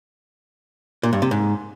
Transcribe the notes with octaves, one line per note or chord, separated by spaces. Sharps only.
A#2
G2
C3
G#2